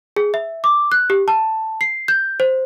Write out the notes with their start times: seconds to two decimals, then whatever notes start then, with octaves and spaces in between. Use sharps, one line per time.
0.16 G#4
0.34 E5
0.64 D6
0.92 F#6
1.10 G4
1.28 A5
1.81 C7
2.08 G6
2.40 C5